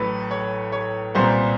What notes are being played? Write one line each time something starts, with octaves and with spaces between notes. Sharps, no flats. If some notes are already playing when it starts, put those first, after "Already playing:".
Already playing: A1 A2 F#3 B4
C#5
C#5
C2 A#2 G3 B3 C5